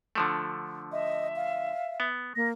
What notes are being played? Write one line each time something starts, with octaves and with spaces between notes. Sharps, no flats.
D3 F3 A3
D#5 E5
F5
B3
A#3 A#6